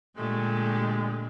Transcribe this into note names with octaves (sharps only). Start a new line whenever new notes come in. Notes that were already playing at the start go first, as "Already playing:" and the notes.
A#2 D3 G#3 A3 G4